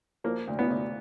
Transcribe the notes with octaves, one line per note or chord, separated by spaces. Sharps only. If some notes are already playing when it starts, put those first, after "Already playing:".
F3 A#3
D2
B3
D2